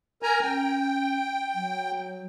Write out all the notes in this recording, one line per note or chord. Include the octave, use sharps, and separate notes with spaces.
A#4 G#5 A#5
C#4 G5
F#3